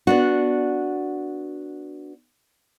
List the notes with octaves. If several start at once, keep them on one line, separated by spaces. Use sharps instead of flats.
B3 D4 F#4